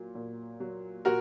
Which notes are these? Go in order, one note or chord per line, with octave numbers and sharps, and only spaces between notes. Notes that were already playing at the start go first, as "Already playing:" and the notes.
Already playing: A#2 F#3
A#2
F#3
A#2 F#4 A#4